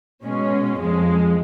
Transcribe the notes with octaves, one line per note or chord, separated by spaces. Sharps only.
B2 G#3 C#4
F2 F3 G#3